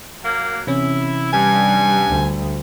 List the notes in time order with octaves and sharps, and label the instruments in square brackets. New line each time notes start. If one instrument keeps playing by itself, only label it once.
[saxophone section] F#3 A#3
[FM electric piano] C3 E3 C#4 [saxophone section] E4
[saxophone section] G2 [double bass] G3 [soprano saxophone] G#5
[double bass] D2 G3